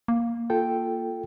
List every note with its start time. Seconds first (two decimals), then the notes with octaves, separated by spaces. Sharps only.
0.08 A#3
0.50 F4 A4 G5